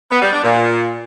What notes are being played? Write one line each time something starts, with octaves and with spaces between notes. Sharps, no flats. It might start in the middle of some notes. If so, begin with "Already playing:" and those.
B3
G3
D4
A#2